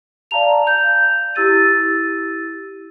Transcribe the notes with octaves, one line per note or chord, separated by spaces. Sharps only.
D5 F5 A5 A#5 F7
G6
E4 G4 E6 A6 D#7